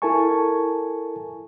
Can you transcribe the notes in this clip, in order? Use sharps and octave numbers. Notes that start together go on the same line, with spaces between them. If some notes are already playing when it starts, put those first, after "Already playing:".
E4 A4 A#4 G#5 A5 C#6